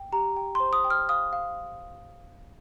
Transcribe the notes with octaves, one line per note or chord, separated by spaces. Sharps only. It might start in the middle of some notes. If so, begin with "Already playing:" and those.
Already playing: G5
G4 A#5
G5
C6
C5
D#6
G5
F6
F5 D#6
F5